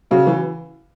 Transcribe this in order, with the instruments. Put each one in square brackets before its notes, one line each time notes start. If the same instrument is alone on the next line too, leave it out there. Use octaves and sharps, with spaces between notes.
[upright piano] C#3 [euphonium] F#4
[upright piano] E3